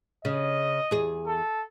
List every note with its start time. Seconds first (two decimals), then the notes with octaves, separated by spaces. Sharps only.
0.25 C#3 D#5
0.91 E2 G#4
1.26 A4